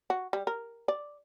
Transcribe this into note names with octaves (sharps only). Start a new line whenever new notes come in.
F#4
G3
A#4
D5